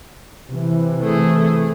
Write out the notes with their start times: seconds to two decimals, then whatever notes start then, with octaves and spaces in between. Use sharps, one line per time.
0.48 C3 E3
1.02 A3 G#4